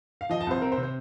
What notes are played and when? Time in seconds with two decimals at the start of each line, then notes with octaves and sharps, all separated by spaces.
0.21 F5
0.30 F3 D#5
0.41 A5
0.47 C2 C5
0.61 C4 A#4
0.72 C5
0.77 C3
0.83 C5